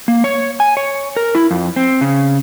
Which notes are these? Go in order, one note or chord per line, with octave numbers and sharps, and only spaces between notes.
A#3
C#5
G#5
C#5
A#4
E4
F2
C4
C#3